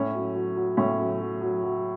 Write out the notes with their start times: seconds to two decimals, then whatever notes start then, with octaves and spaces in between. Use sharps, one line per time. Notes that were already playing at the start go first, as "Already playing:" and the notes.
Already playing: A2 C#4
0.15 F#3
0.35 F#3
0.56 F#3
0.77 A2 C#4
0.99 F#3
1.21 F#3
1.41 F#3
1.63 F#3